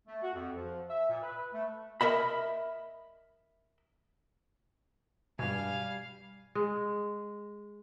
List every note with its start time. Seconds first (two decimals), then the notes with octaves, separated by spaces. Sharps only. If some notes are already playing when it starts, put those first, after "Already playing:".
0.07 A3
0.22 F#4
0.34 F2
0.56 F3
0.89 E5
1.10 A#2
1.23 B4
1.53 A3
2.01 A#4 D#5 E5 B5
5.39 G2 B2 G3 F5 G#5
6.55 G#3